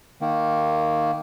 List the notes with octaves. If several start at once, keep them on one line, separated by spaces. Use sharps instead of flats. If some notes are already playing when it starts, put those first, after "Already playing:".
D#3 A#3